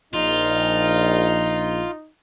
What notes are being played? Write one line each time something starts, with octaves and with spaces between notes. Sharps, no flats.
A#1 D#4 F4